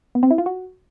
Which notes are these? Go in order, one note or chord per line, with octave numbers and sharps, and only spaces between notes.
B3
C4
E4
F4
F#4